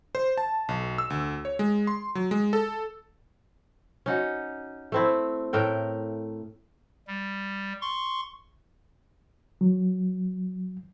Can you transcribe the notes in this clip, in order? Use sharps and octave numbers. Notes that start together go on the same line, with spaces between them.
C5
A5
B1
E6
D2
C#5
G#3
C6
F#3
G#3
A4
C#4 D#4 F#4
A3 C4 E4
A2 A3 A#4 G5
G3
C6 C#6
F#3